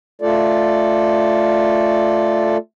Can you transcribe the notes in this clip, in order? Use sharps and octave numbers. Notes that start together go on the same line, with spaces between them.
A3 F4 A4 D5